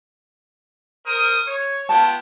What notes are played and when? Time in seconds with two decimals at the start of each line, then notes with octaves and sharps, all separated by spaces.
1.05 A#4 C5 D#6
1.46 C#5
1.89 B3 F4 G5 A5